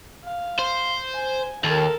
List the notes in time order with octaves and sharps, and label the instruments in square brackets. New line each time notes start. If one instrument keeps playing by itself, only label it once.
[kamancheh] F5
[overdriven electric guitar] C5
[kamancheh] G#5
[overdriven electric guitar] D#2 [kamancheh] A4 A#4